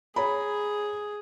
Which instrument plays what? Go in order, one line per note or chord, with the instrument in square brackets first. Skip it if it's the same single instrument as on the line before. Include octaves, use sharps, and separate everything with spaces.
[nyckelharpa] G#4 [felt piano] C#5 A#5 B5